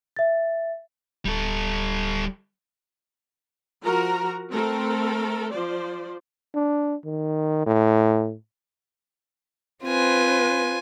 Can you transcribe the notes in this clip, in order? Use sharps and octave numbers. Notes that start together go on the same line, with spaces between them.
E5 A6
D1 G3 A4
F3 F#4 A#4 A#5
A3 C4 A4 A#4
F3 C5 D5
D4
D#3
A2
C4 F4 B4 G#5